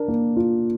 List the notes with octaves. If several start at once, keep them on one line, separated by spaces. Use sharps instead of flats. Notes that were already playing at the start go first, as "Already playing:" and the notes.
Already playing: D4 A#4
A#3
F4